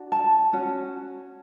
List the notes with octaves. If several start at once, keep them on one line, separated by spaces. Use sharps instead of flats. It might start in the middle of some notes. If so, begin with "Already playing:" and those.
Already playing: D4 F#4
A5
C#4 F#4